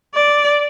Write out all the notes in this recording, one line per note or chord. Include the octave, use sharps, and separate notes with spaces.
D5